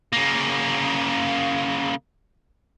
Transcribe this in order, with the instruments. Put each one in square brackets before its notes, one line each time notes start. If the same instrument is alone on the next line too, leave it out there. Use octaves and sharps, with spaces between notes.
[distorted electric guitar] C#3 A#3